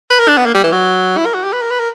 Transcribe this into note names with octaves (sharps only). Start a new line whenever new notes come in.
B4
A#4
D4
B3
A#3
G3
E3
F#3
E4
A#4
F#4
G4
B4
A#4
B4
A#4